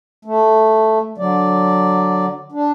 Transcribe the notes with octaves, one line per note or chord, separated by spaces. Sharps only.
A3
D3 F#3 D5
D4